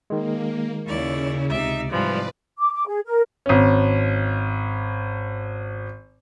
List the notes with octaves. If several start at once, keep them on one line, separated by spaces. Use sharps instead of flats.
D#3 G#3 A#3
D#2 C#3 E4 C#5 D5
C#2 C3 D#4 D5 E5
G#2 C3 E3 F3 G3 B4 D5
D6
D6
G#4
A#4
G#1 C#4